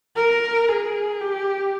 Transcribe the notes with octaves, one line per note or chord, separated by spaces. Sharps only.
A#4
G#4
G4